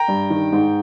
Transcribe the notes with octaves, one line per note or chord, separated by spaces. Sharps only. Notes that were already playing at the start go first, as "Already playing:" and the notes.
Already playing: G5 A#5
G2
D#3
G#2